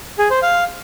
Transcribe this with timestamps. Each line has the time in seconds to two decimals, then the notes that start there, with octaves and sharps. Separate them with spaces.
0.19 G#4
0.30 C5
0.42 F5